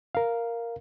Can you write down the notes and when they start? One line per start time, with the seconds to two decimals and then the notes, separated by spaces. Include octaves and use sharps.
0.15 A#4 F5